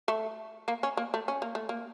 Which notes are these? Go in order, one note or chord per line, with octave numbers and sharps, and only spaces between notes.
A3
A#3
C#4
A#3
A3
C#4
A#3
A3
A#3